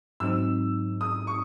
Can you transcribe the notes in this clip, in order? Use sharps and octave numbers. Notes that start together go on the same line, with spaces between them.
G#2 F#3 C4 D#4 E6
D#6
C#6